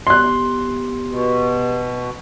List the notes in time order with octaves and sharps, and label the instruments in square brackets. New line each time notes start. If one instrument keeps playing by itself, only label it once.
[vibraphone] B3 G4 [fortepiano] C6 F#6
[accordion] B2